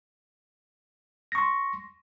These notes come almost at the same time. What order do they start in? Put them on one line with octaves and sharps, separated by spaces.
A#6 C#6 C6